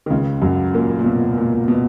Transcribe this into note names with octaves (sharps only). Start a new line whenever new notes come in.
D#3
C#2 C#3
F#2 F#3
A#2 A#3
A#2
B2
A#2
B2